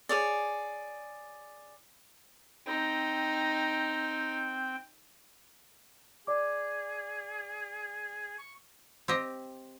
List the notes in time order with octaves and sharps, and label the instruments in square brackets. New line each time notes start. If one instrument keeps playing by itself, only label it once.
[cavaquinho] G#4 C#5 D5
[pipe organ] C4 G5 [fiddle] D#4
[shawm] G#4 [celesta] D5 D6
[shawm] C#6
[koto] C4 G4 D#5